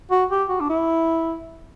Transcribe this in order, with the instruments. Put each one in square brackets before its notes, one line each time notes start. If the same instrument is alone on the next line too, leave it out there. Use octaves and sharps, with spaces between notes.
[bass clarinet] F#4
G4
F#4
D4
E4